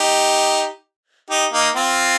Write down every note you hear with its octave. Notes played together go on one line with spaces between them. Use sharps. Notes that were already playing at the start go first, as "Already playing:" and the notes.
Already playing: D#4 G4
D#4 G4
A#3 D#4
C4 F4